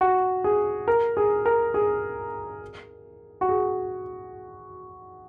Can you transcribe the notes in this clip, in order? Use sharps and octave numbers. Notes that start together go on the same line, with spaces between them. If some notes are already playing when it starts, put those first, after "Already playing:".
F#4
G#4
A#4
G#4
A#4
G#4
F#4
G#4